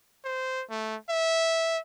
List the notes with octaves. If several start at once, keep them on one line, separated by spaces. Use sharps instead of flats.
C5
A3
E5